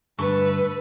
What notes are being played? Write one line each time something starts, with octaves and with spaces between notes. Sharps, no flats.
G2 D3 A3 A4 B4 C#6